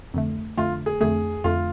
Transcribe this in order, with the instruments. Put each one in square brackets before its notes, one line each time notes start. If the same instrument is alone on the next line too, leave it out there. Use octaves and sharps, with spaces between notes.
[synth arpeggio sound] F2 D3 A3
[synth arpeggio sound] F2 D3 A3 [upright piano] F4
[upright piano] G#4
[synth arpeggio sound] F2 D3 A3 [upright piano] G#4
[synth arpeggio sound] F2 D3 A3 [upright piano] F4